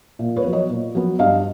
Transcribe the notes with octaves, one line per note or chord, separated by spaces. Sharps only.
A#2
B4 C#5
F#3 B3
C#5 D#5
A#2
F#3 B3
G2 D#5 F5